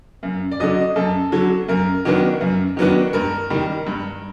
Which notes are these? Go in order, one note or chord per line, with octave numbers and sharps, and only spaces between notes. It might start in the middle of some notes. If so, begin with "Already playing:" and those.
F#2
D5
D3 F#3 D#5
F#2 A4
D3 F#3
F#2 A#4
D#3 F#3 B3 D4
F#2
D#3 F#3 B3 D4
G2 A#4
D#3 G3
G2